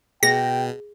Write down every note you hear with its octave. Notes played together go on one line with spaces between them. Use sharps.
B2 G#4 G5 A#6